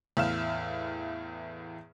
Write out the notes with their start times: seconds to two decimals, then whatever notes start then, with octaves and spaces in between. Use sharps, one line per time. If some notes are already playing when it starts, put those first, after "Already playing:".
0.17 E2 A2 E5 F5 F6 E7